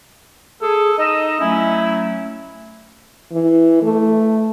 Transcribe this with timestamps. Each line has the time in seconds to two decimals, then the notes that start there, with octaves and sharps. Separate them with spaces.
0.62 G#4 A4
0.98 D#4 D#5 E6
1.40 F#3 A3 C#4 E4
3.33 E3
3.83 A3